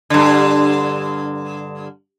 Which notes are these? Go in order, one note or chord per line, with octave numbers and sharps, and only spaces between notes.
G2 D3